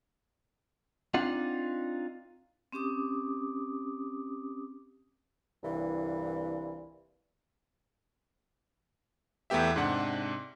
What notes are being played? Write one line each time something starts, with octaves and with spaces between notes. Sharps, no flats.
C4 D4 D#4 F4 F#5
C4 C#4 G4 D6 D#6
C2 G2 A#2 E3
E2 A3 B3 G4 E5
G#2 C3 D4 F#5